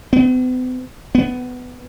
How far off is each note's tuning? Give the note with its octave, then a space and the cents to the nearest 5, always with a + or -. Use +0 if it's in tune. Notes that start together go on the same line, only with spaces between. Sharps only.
B3 +45
B3 +15